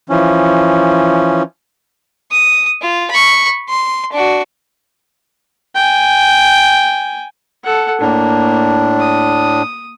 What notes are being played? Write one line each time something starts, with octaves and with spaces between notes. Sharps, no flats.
E3 F3 C#4
D#6
F4
B5 C#6
C6
D4 F#4
G5 G#5
A4 F#5
A2 A#3 D4
D#6